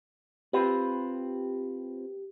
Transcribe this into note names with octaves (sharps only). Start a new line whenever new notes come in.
C4 F4 G4 B4